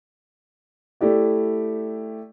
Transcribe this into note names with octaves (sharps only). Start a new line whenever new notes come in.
A3 E4 G4 D5